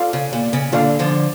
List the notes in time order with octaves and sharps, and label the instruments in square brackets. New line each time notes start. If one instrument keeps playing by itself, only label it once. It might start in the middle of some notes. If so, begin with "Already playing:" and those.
Already playing: [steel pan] F4 A4 D5 F5
[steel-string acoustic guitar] C#3
A#2
C#3
[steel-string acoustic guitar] A#2 D3 [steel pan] F4 A4 D5 F5
[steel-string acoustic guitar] D3 F3